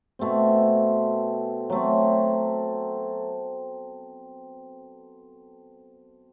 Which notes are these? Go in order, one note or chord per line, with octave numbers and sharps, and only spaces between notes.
B2 A3 C4
F#3 A3 C4